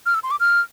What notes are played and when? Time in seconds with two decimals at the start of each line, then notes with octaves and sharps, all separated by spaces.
0.06 F6
0.14 E6
0.23 C6
0.31 D6
0.40 F6